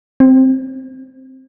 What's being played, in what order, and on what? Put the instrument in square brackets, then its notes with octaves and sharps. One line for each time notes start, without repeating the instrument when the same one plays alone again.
[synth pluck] C4